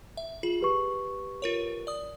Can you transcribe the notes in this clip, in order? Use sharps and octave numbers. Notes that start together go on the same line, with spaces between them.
E5
F4 G#4
G4 B4 C#6
F4 A#4 C#5
D5 D#6